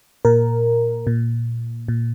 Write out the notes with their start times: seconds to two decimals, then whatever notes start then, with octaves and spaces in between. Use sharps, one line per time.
0.25 A#2 A#4
1.07 A#2
1.88 A#2